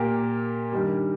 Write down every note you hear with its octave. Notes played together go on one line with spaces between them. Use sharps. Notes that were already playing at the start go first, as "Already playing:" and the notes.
Already playing: A#2 A#3 G4 A#4
G2 D#3 G3